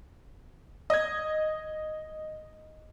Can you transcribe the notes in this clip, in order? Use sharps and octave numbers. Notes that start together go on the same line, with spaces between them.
D#5 G#6